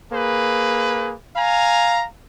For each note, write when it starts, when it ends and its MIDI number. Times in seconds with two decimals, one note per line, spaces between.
0.13 1.14 58
0.13 1.14 68
0.13 1.14 71
1.36 2.06 77
1.36 2.06 80
1.36 2.06 82